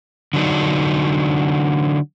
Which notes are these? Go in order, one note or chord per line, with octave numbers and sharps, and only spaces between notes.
D3 F#3 D4 D#4